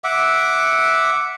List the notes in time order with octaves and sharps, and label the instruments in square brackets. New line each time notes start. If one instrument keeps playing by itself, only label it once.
[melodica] E5 F#5 D6